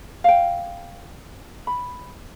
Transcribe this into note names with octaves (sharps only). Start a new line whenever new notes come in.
F5 G5
B5